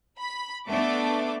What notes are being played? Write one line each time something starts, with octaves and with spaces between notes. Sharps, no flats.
B5
A3 B3 D4 D6